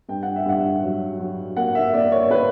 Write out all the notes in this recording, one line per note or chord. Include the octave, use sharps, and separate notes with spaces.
G2 G5
F#5
E5
G2 F#5
F#3
F#3
A#3 F#5
E5
A#3 D5
C#5
A#3 B4